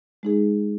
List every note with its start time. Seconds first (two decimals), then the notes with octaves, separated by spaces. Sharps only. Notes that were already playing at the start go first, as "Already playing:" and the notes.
0.23 G#3 D#4 G#4